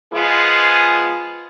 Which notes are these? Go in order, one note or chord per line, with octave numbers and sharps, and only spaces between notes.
F3 G#3 B3 F4 G#4